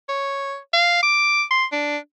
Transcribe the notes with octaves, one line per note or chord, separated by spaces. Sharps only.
C#5
F5
D6
C6
D4